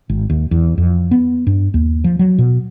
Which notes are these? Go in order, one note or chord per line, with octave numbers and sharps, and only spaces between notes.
G#1
D#2
E2
F2
B3
G2
D#2
F3
F#3
B2